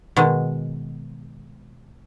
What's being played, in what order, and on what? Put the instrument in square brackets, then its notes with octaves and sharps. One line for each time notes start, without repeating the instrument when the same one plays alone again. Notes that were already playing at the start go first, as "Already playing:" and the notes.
[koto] B2 D#3 G#3